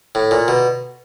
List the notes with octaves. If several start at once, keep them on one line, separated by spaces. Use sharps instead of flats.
A2
A#2
B2